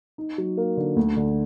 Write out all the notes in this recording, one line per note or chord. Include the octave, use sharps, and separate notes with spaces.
D#4
F#3
A#3
D3
D2
D3